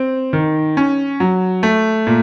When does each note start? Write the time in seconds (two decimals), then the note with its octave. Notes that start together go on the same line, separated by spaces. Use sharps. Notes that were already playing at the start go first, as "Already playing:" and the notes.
Already playing: C4
0.33 D#3
0.77 C#4
1.20 F#3
1.63 A3
2.07 A#2